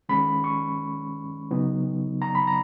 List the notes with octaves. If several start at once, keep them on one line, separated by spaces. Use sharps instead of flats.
D#3 G#3 C#4 B5
C#6
C#3 F#3 B3 D#4
A#5
B5
A#5